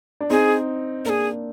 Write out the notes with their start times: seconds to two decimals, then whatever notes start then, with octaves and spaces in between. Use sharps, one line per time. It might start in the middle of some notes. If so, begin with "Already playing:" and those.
0.20 D4
0.30 C4 D#4 G#4
1.05 A#3 D4 G#4 A#4